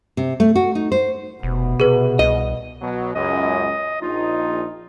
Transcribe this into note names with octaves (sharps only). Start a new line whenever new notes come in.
C3
A3
F#4
D#4
C5
F1 B2
C3 G#4 B4
C2 D#5
B2 F#3
C#2 F#2 D#5
A#1 D#4 F4